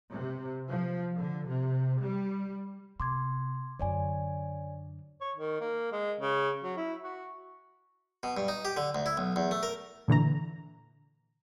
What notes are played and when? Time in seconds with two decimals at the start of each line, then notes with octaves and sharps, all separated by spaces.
0.13 C3
0.68 F3
1.15 D3
1.48 C3
2.01 G3
3.00 C3 C6 D6 G#6
3.79 F#2 D3 C#5 D5 G#5
5.21 C#5
5.36 D#3
5.61 A#3
5.92 G#3
6.20 C#3
6.63 F#3
6.77 E4
7.03 F#4
8.23 B2
8.37 G2
8.48 D#4
8.65 G4
8.77 D3
8.95 D2
9.06 E4
9.17 B1
9.36 E2
9.51 A3
9.63 A#4
10.08 A#2 D3 E3 A#5